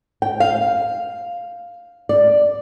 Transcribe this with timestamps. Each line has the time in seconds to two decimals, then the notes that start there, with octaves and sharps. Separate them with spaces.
0.22 G5
0.40 F5
2.09 D5